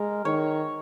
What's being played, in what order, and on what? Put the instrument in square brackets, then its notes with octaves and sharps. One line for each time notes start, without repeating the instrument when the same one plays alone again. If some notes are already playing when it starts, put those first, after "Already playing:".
Already playing: [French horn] G#3 [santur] A#4
[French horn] D#3 [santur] C#5